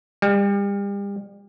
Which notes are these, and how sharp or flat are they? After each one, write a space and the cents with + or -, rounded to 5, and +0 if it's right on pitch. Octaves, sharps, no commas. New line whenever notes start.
G3 +35